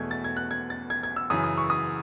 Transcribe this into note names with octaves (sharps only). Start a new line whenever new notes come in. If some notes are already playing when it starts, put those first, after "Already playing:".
Already playing: E2 B2 A3 G#6
A6
G#6
F#6
G#6
A6
G#6
G#6
E6
F#2 C#3 E3 D#6
D#6
C#6
D#6